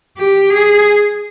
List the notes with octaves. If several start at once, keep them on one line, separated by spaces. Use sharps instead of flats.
G4
G#4